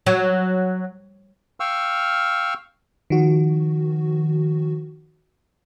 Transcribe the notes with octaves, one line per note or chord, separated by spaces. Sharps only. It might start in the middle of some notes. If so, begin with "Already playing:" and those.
F#3
F5 G5 C#6 E6 F6
D#3 F3 F#4